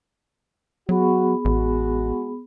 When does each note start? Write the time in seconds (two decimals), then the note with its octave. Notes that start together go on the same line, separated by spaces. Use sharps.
0.89 F#3 B3 F#4 G#4 B5
1.45 A1 G#3 F#4